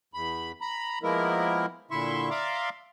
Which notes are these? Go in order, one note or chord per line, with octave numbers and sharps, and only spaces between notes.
E2 B5
A#5 B5
F3 G#3 A#3 B3 E4 A#4
A#2 D3 E4 E5 C6 C#6
D5 E5 F5 A#5 C6 D6